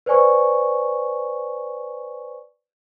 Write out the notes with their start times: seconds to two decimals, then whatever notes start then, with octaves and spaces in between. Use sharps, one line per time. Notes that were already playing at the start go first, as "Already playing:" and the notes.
0.06 B4 C5 D5 G#5 C#6